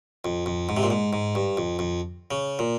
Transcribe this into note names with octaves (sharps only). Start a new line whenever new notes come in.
F2
F2
G#2
C3
A#2
G#2
G#2
G2
F2
F2
C#3
A#2